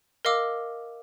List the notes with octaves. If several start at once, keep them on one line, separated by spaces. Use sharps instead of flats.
A#4 D#5 F5 D6 E6